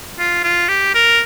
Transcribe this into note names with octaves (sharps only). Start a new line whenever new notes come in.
F4
F4
G4
A#4